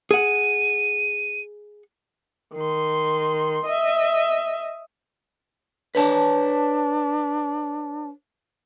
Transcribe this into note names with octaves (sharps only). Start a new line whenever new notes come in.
G#4 F#5 D#7
D#3 C6
D#5 E5
D4 B4 C#5 A5